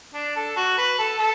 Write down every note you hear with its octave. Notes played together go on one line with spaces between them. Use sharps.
D4
A4
F#4
B4
A4
A4